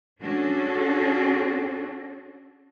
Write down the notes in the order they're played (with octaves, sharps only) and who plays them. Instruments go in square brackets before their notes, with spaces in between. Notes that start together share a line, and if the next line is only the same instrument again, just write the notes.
[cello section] C#4 D4 F#4 G#4 A4